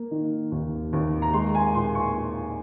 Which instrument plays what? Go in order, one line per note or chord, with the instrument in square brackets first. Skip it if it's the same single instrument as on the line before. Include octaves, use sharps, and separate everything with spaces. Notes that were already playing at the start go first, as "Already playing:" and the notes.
Already playing: [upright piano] A#3
D#3
D#2
D#2
A#5
G#3 C6
G#5
A#2 C6
C#6